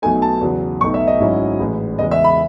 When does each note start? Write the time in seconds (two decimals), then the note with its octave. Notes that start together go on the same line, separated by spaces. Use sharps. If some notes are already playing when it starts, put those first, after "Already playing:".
0.02 B1 B2 A3 D#4 G#5
0.22 A5
0.41 E2 C#3 F#3
0.81 B1 B2 A3 D#4 C#6
0.94 E5
1.07 D#5
1.20 G#1 G#2 F#3 C#4 E4
1.59 A1 A2 G#3
1.99 E2 C#3 G#3 D#5
2.11 E5
2.24 B5